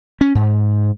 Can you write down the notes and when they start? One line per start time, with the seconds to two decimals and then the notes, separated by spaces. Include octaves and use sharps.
0.21 C#4
0.35 G#2